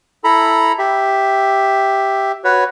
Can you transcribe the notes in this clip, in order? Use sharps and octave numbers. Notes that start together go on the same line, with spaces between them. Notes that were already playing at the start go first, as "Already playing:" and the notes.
E4 A4 A#5 B5
G4 E5
F#4 B4 C#5